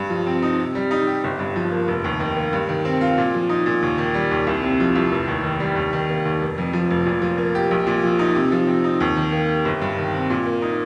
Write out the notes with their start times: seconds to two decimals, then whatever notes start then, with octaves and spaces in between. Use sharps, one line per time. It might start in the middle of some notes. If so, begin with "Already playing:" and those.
Already playing: G2
0.10 F3
0.26 C4
0.42 D#4
0.59 C3
0.75 G3
0.91 D#4
1.07 G4
1.24 G1
1.39 G2
1.56 F3
1.72 A#3
1.88 F1
2.04 D#2
2.20 D#3
2.37 A#3
2.53 G2
2.69 D#3
2.85 C4
3.01 F4
3.18 A#2
3.34 F3
3.49 D#4
3.66 A#2
3.82 D#2
3.98 D#3
4.14 G3
4.31 D#2
4.47 C2
4.63 C3
4.80 F3
4.95 C2
5.11 F1
5.27 D#2
5.44 D#3
5.60 G3
5.76 D#2
5.93 D#3
6.10 A#3
6.25 D#2
6.41 F1
6.58 F2
6.73 F3
6.91 F1
7.06 A#2
7.22 F3
7.38 A#3
7.55 G4
7.71 A#1
7.87 A#2
8.04 F3
8.19 D#4
8.35 C3
8.52 F3
8.67 C4
8.84 D#4
9.00 D#2
9.17 D#3
9.32 A#3
9.49 G4
9.65 G1
9.82 G2
9.98 D#3
10.14 C4
10.30 A#2
10.46 A#3
10.62 D#4